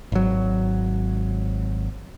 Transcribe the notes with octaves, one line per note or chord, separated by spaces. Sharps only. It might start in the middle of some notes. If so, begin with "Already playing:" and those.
G#1 F#3